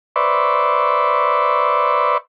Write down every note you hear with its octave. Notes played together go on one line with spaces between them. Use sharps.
B4 C5 D5 E5 C#6